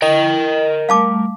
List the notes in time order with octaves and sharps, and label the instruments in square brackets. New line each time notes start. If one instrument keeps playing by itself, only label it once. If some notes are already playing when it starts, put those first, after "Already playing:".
[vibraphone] E4 [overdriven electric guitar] A#4 G5 [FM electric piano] D#5
[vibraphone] G3 A3 [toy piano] F5 A5 D6